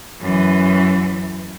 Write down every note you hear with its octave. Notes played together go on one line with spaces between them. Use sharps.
F#2 E3